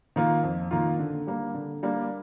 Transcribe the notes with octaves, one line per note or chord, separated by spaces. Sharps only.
D#3 A#3 F4
F2
D#3 A#3 F4
D3
G3 A#3 D4
D3
G3 A#3 D4